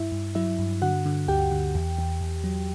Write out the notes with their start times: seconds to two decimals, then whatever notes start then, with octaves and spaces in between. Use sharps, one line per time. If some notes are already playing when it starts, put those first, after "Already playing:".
Already playing: G2 E4 E5
0.12 G2
0.35 F#3 E4 E5
0.59 G2
0.82 D3 F#4 F#5
1.06 D3
1.28 D2 G4 G5
1.51 D3
1.75 E2
1.99 E2
2.21 E2
2.44 F#3